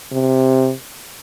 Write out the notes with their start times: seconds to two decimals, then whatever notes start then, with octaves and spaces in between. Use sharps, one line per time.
0.12 C3